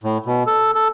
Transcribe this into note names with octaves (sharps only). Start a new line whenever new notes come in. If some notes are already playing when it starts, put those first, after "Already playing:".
A2
B2
A4
A4